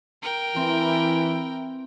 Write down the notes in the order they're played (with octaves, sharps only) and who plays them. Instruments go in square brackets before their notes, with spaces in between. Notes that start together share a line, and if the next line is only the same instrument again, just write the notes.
[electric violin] A#4 G5
[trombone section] E3 [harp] C4 [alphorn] E4